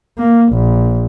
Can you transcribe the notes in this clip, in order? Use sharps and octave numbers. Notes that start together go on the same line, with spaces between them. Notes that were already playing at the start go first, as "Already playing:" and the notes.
A#3
A#1